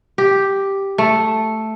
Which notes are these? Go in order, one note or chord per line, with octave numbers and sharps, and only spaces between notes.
G4
A3